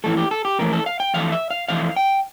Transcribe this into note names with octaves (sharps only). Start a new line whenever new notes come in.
F2 E3 A3 A4
G4
A4
G4
F2 E3 A3 A#4
A4
F5
G5
F2 E3 A3 F5
E5
F5
F2 E3 A3 F5
G5